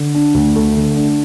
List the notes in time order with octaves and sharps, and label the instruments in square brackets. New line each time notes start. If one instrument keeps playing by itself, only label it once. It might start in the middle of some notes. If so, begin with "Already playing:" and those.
Already playing: [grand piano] D3
D4
D2
A3
D3
D4